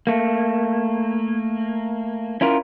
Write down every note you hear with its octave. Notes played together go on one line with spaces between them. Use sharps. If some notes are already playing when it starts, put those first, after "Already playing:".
A3 A#3
C#4 E4 F4 A#4